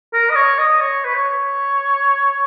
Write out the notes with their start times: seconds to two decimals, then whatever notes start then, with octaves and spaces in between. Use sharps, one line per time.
0.13 A#4
0.30 D#5
0.36 C#5
0.58 D#5
0.80 C#5
1.05 B4
1.14 C#5